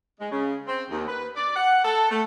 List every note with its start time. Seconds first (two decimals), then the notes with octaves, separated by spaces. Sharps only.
0.20 G#3
0.32 C#3
0.67 C4
0.90 D#2
1.07 B4
1.36 D5
1.56 F#5
1.85 A4
2.11 A3